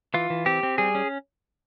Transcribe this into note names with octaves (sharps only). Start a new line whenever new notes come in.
E3 F4
E3
C4 G4
C4
G3 G#4
C#4